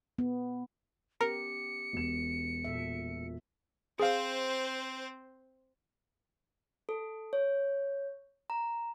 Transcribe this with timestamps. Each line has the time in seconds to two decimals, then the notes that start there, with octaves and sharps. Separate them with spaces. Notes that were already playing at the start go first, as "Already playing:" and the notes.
0.19 B3
1.21 B3 C#4 G4 A#4 C#7
1.93 E1 E7
2.65 A#2 A4 E5
4.00 C4 G#4 C5 F5
6.89 A4
7.33 C#5
8.50 A#5